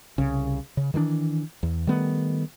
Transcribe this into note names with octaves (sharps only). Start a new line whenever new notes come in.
C2 C#3
C#3
D#3 E3 G3 D4
E2
D#3 G3 A3 B3